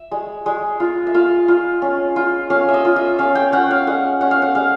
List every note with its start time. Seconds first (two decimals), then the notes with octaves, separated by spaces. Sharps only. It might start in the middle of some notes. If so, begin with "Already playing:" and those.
Already playing: E5
0.11 G#3
0.46 G#3
0.80 F4
1.07 E5
1.14 F4 F5
1.48 F4
1.82 C#4
2.16 F4
2.50 C#4 F5
2.69 E5
2.74 D#5
2.85 F4
2.96 E5
3.18 C#4 F5
3.35 G5
3.52 C#4 F#5
3.71 F5
3.87 G#3 F#5
4.21 C#4 F#5
4.31 F5
4.42 F#5
4.55 G#3 F5